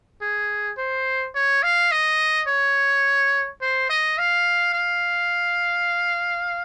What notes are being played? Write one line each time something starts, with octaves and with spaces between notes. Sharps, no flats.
G#4
C5
C#5
F5
D#5
C#5
C5
D#5
F5
F5